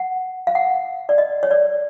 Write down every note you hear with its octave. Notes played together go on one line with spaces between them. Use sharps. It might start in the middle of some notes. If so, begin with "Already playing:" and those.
Already playing: F#5
F5
F#5
D5
D#5
C#5
D5